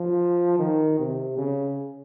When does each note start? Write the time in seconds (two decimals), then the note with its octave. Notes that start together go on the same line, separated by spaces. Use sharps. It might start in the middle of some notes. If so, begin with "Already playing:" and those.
Already playing: F3
0.59 D#3
0.98 C3
1.38 C#3